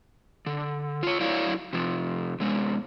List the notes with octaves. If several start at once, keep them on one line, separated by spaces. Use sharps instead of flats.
D3
F4 C#5
F#3 E4 C#5 D5 F5
C3 F3
C3 G#3 B3